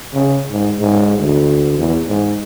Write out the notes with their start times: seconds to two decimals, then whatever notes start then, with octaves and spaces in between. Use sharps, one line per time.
0.13 C#3
0.51 G#2
0.80 G#2
1.18 D2
1.78 E2
2.07 G#2